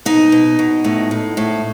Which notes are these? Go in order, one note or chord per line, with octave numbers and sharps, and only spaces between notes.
B2 D#4
B2
B2
A2
A2
A2